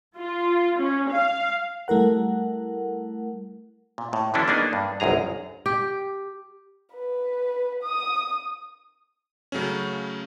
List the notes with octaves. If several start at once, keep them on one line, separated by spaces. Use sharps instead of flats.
F4
C#4
F5
G3 A3 E4 A#4 F#5
A#2
A2
D3 E3 F#3 C#4 D4 E4
A#3 B3 D4 D#4 G#4
G2
G1 C2 F#2 G#4 A#5
G4
B4
D#6
C#3 F#3 A3 C#4